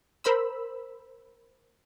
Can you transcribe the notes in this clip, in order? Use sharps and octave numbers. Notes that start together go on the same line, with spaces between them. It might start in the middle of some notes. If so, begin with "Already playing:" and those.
A#4 C5 B5 E6